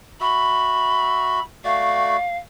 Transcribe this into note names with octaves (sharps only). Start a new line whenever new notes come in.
F#4 E5 B5
A3 F#4 D5 F5